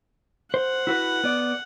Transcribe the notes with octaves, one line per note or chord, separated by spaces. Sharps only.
C5 F#5
E4 F#4 B4
B3 D5